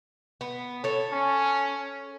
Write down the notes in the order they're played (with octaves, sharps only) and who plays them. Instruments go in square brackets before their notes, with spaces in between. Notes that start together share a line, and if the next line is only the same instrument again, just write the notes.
[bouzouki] B3
A4 C#5
[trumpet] C#4